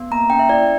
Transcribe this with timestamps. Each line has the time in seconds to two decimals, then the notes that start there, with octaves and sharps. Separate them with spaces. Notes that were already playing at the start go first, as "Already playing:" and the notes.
Already playing: B3
0.11 A#3 A#5
0.30 C#4 G5
0.39 E5
0.49 E4 D5